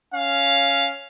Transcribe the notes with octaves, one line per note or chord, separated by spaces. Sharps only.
C#4 F5